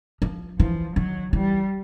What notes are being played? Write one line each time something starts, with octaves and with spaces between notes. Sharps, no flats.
F3
E3 F3
D#3 F#3
E3 G3